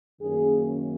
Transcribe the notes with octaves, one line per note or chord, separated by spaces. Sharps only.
F#2 D#3 A#3 C#4 G#4